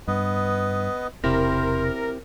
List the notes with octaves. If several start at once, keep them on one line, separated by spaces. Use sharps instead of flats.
G2 B3 B4 D#5
E1 C3 C4 E4 G4 A#4 C5